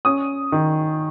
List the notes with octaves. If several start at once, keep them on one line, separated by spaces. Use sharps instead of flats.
C#4 D#6
D#3